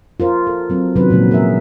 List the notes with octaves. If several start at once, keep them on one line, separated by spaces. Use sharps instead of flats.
F4 A#4 C5
A4
F#3 C4
C3 D#3 F#3 C#4 D4 B4
A#2 C#3 F3 F#3 G#3
G#4 A#4 E5